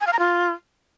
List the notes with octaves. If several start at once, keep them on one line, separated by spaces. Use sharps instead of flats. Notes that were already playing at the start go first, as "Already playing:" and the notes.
G#5
F5
A#5
F4